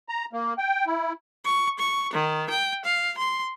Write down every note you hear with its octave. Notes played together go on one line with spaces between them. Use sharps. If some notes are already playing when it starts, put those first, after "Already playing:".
A#5
A#3
G5
E4
C#6
C#6
D#3
G5
F5
C6